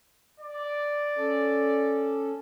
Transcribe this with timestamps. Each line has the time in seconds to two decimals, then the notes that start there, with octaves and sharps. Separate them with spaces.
0.40 D5
1.17 C#4 A4